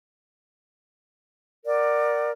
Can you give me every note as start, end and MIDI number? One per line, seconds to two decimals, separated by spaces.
1.64 2.30 70
1.64 2.30 74
1.64 2.30 78